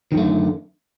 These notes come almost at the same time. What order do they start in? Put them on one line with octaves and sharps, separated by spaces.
D#3 F#2 A3 D3